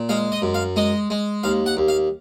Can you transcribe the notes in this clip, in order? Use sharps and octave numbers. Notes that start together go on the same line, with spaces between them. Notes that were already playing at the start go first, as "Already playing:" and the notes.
Already playing: A#2
G#3 F5
D#5
F#2
F5
G#3 D#5
G#3
D#2 F5
F#5
D#2
F5